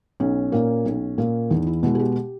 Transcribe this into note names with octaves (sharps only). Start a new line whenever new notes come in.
B1 C#4
A#2 A#3
B1
A#2 A#3
E2 D#4
E4
B2 G#3 E4
G#4
G4
G4